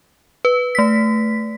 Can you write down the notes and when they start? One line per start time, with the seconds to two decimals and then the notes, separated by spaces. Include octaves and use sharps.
0.45 B4
0.75 A3 B6